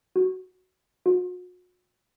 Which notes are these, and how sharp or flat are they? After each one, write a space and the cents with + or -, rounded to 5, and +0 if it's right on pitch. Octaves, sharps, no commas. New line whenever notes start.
F#4 +10
F#4 -40